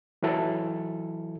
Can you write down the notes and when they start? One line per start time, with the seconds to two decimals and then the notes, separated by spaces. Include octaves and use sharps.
0.23 E3 F#3 E4 A4